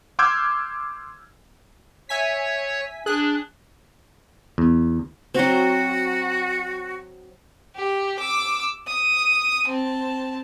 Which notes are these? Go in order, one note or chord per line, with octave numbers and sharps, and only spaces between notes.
C6 D6 E6 F6 G6 G#6
C#5 E5 G#5 B6
D4 G#4 F#6
E2
F#3 C4 F#4
G4
D6 E6
D#6
C4 A5